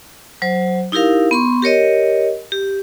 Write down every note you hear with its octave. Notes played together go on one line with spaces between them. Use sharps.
F#3 C5
D#4 E4 G4 A#4 F5
B3 C6 C#6
G4 A#4 C#5 D#5
G4